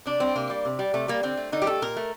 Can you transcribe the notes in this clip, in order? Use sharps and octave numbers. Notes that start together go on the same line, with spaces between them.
C3 D4
G3 C4
C3 A#3
G3
C3
G3
C3 A3
G3 A#3
D3 C4
A3
D3 D#4
G4
A3 A4
A#2 A#4
A3